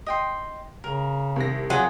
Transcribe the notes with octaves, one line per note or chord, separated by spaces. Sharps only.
D#5 G5 C6
C#3 A#4
C2 D#3 A#6
F#3 F4 G#4